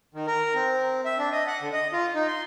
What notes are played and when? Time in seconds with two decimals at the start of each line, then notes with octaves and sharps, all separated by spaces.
0.14 D#3
0.27 A#4
0.55 C4
1.05 E5
1.19 D4
1.32 D#5
1.47 F#5
1.61 D3
1.73 D#5
1.93 F4
2.15 D#4
2.28 C6